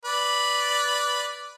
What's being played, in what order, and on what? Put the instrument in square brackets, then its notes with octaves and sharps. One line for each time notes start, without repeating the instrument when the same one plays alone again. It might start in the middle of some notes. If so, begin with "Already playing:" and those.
[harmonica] B4 D5